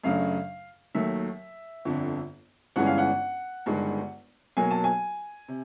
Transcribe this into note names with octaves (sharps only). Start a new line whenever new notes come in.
F#2 C#3 F#3 A3 D4 F5
D#2 D#3 F#3 A3 E5
G1 F2 D3
G1 G2 E3 G#3 C#4 F#5
F5
F#5
G1 G2 D#3 G#3
B1 B2 F#3 A#3 G#5
A5
G#5
C3